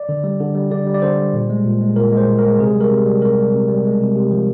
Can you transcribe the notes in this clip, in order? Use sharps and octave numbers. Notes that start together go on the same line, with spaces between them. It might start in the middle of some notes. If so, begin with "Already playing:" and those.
Already playing: D5
D3
G3
D3
G3
D3 D5
G3
D5
D3 C5
G3
A#2
G#3
A#2
G#3
A#2 A#4
G#3
C5
A#2
A#4
G#3
C3 G#4
G3
A#4
C3
G3
C3 A#4
G3
C3
G3
G#3
C3
C3
F3